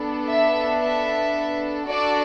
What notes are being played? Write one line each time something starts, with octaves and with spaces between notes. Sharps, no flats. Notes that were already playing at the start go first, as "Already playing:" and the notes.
Already playing: B3 D4 A4
E5
E5
D4 F#4 A4 D5